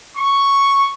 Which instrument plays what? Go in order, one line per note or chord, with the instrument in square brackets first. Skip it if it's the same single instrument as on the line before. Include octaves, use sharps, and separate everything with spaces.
[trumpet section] C#6